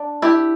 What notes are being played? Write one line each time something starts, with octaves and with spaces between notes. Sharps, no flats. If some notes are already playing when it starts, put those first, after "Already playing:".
Already playing: D4
E4 G4